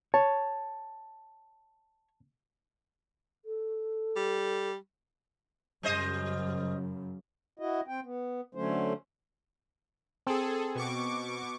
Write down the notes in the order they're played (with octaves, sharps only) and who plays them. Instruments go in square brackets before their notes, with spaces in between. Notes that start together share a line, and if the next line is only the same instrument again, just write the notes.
[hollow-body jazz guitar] C#5 [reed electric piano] A5
[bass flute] A4
[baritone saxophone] G3
[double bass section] F#2 C#3 [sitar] G3 C5 D#5
[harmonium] E4 F#4 D#5
C4 G5
B3
D3 F#3 A3 C#4 C5
[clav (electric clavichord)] C4 [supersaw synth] G#4 A4
[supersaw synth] B2 C#6 D6